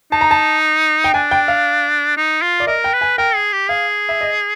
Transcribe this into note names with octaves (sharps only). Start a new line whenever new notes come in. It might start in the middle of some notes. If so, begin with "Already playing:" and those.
D#4 A5
A#5
A5
G5
D4 G#5
G5
F5
D#4
F4
D5
A#4 D#5
G5
B4
G#5
A#4 G5
G#4
G4
G#4 F5
E5
D#5